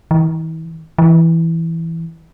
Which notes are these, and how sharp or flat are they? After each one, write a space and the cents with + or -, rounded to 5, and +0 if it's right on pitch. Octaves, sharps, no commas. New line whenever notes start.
E3 -40
E3 +0